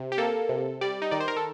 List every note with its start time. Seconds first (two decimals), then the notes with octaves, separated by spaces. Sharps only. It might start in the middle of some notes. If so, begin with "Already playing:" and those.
Already playing: C3
0.12 G4
0.18 A#3 A4
0.49 C3
0.81 G3 D5
1.02 D#4
1.11 D#3 D5
1.20 C5
1.28 A#4
1.37 A4